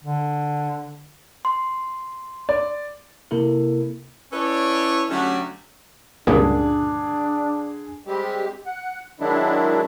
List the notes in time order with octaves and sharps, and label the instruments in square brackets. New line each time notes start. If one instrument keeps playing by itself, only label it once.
[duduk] D3
[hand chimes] C6
[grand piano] D5
[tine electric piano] C3 A#3 E4 A4 A#4
[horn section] C#4 E4 A4 B4 C#5 D5
D3 F#3 A3 C#4 F#4 G4
[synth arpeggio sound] C#2 G2 A#2 [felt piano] D3 G#4 [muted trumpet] D4
[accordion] G3 G#3 C4 G4
F#5
D#3 F#3 G#3 D4 E4